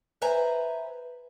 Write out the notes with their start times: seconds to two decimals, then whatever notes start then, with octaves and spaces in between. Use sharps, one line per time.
0.22 B4 C5 E5 G#5 A#5